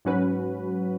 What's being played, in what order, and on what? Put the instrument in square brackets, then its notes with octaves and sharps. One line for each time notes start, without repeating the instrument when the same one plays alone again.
[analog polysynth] G#2 F#3 C#4 F#4 B4